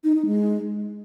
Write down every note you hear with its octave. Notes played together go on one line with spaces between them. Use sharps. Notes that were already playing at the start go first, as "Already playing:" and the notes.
D#4
D#4
G#3